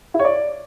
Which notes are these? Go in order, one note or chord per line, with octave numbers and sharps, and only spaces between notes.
E4
C#5
D5